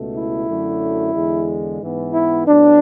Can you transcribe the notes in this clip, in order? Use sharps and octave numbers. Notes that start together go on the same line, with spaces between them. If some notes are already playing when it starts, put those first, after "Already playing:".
Already playing: C#2 B2 A3
E4
F#2 D3 F#3 A3
E2 D3 G#3
G#2 E3 B3
E4
A2 F#3 B3 D4